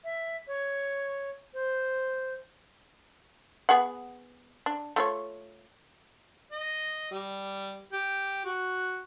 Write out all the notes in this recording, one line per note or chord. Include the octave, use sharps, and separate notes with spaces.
E5
C#5
C5
B3 G#4 F#5
D4
A3 F4 C#5
D#5
G3
G4
F#4